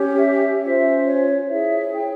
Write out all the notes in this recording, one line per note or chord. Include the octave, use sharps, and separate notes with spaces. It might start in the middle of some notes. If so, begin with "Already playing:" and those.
Already playing: C#4 G4 C#5
E5
C#4 F4 C5 E5
C#5
E4 G#4 C#5 E5
G5